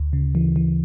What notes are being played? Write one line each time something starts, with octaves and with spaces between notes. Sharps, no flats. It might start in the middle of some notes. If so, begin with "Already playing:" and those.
Already playing: D2
C#3
E3
E3